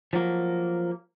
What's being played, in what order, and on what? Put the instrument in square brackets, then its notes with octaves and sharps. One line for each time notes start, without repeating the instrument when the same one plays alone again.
[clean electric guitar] F3 F#3 A#3